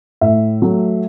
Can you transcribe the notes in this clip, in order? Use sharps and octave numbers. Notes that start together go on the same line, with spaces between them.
A2 E5
F#3 A3